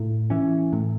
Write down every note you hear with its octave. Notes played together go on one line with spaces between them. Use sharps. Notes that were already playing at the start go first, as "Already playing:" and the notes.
Already playing: A2
E3 C#4
A2